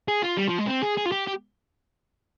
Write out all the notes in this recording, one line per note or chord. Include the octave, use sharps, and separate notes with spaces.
G#4
F4
G3
F3
G#3
C4
G#4
G#4
F4
G4
G4